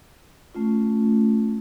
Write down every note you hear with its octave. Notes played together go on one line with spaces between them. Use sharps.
A3 C#4 F4